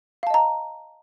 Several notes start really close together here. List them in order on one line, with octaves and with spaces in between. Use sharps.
F5 A5 D#5 A#5